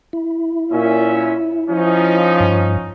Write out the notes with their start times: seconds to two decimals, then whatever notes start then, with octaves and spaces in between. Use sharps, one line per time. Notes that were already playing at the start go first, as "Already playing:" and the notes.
0.13 E4
0.72 A#2 C#4 E5
1.69 F3 C#4 D#4
2.40 G2